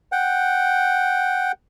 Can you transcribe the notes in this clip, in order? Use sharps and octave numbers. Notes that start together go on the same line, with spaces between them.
F#5 G5